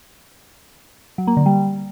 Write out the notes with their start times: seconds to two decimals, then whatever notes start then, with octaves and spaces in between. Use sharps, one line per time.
1.18 F#3
1.27 A#3
1.37 D3
1.46 G3